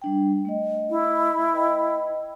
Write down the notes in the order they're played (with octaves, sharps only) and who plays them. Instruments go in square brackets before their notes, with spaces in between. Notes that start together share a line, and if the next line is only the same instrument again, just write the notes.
[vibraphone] G3 D4 G5
A3 D#5
[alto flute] E4
[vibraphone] B4 D#5 G5